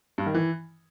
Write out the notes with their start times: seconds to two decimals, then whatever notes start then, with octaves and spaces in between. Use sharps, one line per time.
0.18 G2
0.26 D#3
0.34 E3